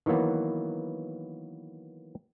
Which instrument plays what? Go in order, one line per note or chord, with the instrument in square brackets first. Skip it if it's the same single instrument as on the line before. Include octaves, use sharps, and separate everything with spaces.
[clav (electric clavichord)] D#3 E3 F#3 A#3 B3